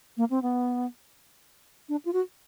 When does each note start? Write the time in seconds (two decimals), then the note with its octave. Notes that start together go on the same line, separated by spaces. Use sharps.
0.17 A#3
0.30 C4
0.42 B3
1.89 D4
2.05 F4
2.13 F#4